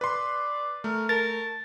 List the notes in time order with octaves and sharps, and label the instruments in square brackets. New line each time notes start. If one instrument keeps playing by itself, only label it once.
[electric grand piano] B4 C6 [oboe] D5
[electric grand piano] A3 [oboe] A#4
[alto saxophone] A#4 [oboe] A5 [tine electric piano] A6